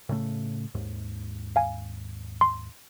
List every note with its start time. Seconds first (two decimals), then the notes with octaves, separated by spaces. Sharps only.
0.09 A2 C#3 A3
0.74 D#2 G#2
1.56 F5 G#5
2.41 C6